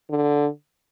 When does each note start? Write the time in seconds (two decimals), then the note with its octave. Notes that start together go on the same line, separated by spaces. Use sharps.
0.10 D3